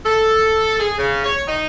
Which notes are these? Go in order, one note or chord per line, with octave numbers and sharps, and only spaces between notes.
A4
G#4
C#3
C#5
D#4